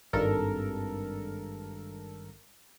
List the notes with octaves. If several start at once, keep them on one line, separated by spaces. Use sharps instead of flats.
G#1 G2 A4 A#4